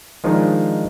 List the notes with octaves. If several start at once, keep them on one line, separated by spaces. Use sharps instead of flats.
D#3 F3 G#3 D4 D#4